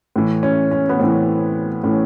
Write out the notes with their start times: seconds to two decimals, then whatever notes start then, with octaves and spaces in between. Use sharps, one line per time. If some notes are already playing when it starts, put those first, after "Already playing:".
0.16 A2 E3
0.43 C#4
0.71 C#4
0.89 B3
0.99 A2 E3 C4
1.84 A2 E3 C#4